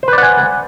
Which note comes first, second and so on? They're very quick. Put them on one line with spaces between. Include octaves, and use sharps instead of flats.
C5 B4 D5 F#5 G#5